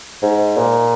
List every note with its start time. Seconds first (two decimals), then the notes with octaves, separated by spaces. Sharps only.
0.22 G#2
0.57 A#2